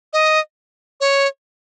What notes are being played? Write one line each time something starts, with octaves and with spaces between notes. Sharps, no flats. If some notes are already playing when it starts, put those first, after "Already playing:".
D#5
C#5